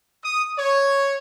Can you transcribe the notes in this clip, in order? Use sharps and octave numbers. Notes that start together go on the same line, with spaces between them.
D#6
C#5